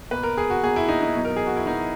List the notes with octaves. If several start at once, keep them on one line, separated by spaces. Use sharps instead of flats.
B2 A#3 B4
A#4
G#4
F#4
B2 A#3 G#4
E4
D#4
D#4
B2 F#3 B3
A#4
G#4
F#4
E4
B2 F#3 B3 D#4